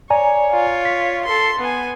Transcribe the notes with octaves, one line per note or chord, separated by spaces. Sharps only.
C#5 D5 G#5 A#5
F4 C#5
B6
A4 C6
B3 G#5